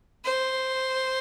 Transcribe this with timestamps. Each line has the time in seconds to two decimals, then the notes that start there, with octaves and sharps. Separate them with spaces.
0.24 C5